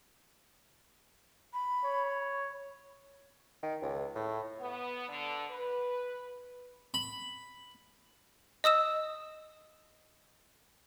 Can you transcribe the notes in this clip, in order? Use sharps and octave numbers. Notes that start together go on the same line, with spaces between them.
B5
C#5
D#3
C#2
A2
B3
D3
B4
B5
D#5 D#6 E6 E7